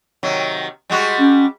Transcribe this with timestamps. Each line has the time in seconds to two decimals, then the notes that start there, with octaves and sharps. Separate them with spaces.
0.23 C3 D#3 F#3
0.90 G3 G#3 F#4
1.19 C#4